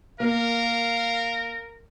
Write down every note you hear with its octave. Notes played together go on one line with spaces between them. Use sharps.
A#3 A#4 F5